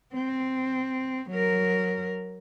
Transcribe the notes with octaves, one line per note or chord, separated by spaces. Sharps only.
C4
F#3 A#4